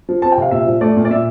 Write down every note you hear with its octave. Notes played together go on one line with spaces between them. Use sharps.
F3
C4 A5
G5
C3 F5
A#2 E5
F3
A3 D5
A#2
D5
A#2 E5